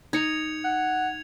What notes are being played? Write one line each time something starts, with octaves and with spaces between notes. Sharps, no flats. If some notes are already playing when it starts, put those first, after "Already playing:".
D#4 G#6 C#7 F7
F#5